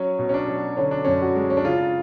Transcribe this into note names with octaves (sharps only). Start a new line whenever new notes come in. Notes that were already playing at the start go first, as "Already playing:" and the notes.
Already playing: F#3 C#4
B2
C#4
D4
F#3
D3 C#4
D4
F#2 C#4
F#4
G#3
C#4
D4
C#3 F4